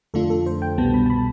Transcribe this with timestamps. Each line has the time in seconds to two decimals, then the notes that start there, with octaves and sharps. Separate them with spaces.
0.14 F2 D3 A3 D4 F4 A4
0.30 A4
0.46 C5
0.62 G5
0.78 C2 B2 G3 B3 A5
0.94 B5
1.06 A5
1.10 B5